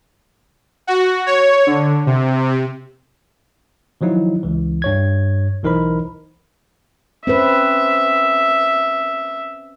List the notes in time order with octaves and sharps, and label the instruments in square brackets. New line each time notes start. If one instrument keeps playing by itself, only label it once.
[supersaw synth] F#4
C#5
D3
C3
[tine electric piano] D#3 F3 F#3 D#4 E4
C#2 E3
G2 C#5 G#6
B1 E3 D#4 A#4 C5 B5
[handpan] C4 C#4 B4 [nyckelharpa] E5